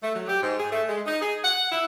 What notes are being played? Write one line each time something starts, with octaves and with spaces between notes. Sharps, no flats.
A3
F#3
G4
G#2
G#4
A3
G#3
D#4
G#4
F#5
E4